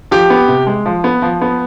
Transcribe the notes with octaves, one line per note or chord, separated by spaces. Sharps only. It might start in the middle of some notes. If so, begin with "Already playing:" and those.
F3 G4
B3
C3
G#3
F3
B3
F3
B3